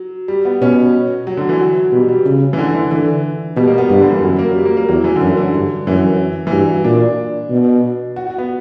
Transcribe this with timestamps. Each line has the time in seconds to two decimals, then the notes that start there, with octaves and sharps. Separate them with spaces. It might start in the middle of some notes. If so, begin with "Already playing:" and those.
Already playing: F#3
0.28 G3
0.45 B3
0.62 B2 C#4
1.27 F#3
1.37 D3
1.49 E3
1.60 F#3
1.92 B2 G3
2.08 G3
2.26 C#3
2.53 E3
2.59 D3
2.75 E3
2.91 D3 E3
3.56 B2 G3
3.68 A#3
3.78 B3
3.89 G2 G3
4.00 D3
4.12 E3
4.22 F#2 F#3
4.39 A#3
4.55 G3
4.65 A#3
4.77 A#3
4.89 E2 F#3
5.04 E3
5.16 F#2 D3
5.37 D3
5.54 G2
5.87 F#2 E3
6.47 E3
6.52 G2 F#3
6.84 A#2 D4
7.51 B2
8.16 F#4
8.27 F#4
8.38 B3